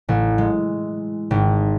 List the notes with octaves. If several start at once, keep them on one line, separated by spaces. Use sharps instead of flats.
A1
G#3
G#1